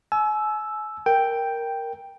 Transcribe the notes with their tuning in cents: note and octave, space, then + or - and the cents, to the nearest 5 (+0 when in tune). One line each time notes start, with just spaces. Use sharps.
G#5 +40 E6 +0
A#4 +0 G5 +0